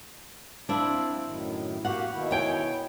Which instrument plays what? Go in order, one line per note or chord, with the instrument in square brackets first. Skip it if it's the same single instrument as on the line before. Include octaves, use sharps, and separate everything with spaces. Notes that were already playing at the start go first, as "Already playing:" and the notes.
[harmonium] C4 F5 [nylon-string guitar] D4 E4
[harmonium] F#2 A2 D#3
[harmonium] A#3 F#4 G4 [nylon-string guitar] F5 F#5
[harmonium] B2 D#3 E4
[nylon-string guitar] C#5 G5 G#5